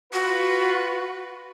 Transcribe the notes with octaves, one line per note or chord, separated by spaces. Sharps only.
F4 F#4 B4